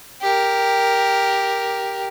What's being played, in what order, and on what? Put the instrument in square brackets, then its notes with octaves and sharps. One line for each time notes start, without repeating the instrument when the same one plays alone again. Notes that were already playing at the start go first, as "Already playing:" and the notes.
[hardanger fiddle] G4 A#4